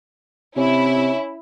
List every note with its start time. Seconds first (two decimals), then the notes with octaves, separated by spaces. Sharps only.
0.57 C3 C#4 E4